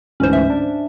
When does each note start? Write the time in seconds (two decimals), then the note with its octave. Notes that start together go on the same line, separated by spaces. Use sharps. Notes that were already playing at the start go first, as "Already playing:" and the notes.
0.20 D2 G#2 E3 C#4 C5
0.33 E5
0.50 D4